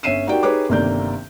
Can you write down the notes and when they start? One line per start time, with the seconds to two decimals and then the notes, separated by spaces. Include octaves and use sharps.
0.03 G1 C#4 E5 C7 D#7 E7
0.27 D#4 F#4 G4 A#4 D5 G5
0.43 D#4 G4 G#4 B4 C#5 D6
0.69 G1 C3 D#3 A#3 D5 G6